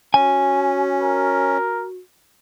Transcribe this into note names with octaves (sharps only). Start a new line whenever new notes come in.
C#4 F#4 G#5
A#4